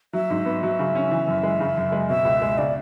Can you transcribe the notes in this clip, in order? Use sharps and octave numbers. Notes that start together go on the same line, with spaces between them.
F#3 E5
G#2
B3
F#3
C#3
C#4
E3
F#2
G#3
C#3
F#2
G#3
B2 E5
C#2
G#3
C#3 D5